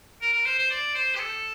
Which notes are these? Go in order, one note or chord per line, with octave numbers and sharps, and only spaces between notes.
A#4
A#4
C5
C5
D5
C5
G4
A4